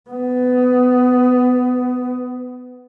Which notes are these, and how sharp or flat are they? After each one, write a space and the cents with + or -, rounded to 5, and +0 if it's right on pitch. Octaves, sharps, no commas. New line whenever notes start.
B3 +20